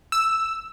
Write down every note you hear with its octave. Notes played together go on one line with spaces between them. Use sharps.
E6